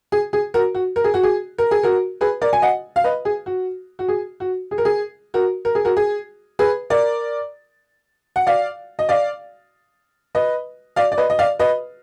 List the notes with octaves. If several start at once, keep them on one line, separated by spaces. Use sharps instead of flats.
G#4
G#4
F#4 A#4
F#4
A#4
G#4
F#4
G#4
A#4
G#4
F#4 A#4
G#4 B4
A#4 D5
G#5
D#5 F#5
F5
B4 D#5
G#4
F#4
F#4
G#4
F#4
G#4
A#4
G#4
F#4 A#4
A#4
G#4
F#4 A#4
G#4
G#4 B4
A#4 D5
F#5
D5 F5
D#5
D5 F5
B4 D#5
D5 F5
D5
B4 D#5
D#5
D5 F5
B4 D#5